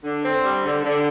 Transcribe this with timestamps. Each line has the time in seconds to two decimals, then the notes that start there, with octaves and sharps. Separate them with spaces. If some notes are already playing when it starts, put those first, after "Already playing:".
0.04 D3
0.24 C4
0.44 G3
0.64 D3
0.83 D3